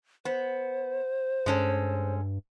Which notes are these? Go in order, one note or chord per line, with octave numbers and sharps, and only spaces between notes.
B3 C5
G2 G#3 C#4 A4